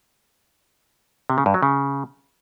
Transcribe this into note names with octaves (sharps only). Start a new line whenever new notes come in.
C3
C#3
G2
F#3
C#3